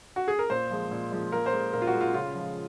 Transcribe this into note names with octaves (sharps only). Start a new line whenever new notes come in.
F#4
G#4
A#4
A#2 C5
F3 G#3
A#2
F3 G#3
A#2 A#4
C5
G#3
A#2 A#4
F4
F#4
G#3
F4
C#3 F4
F3 G#3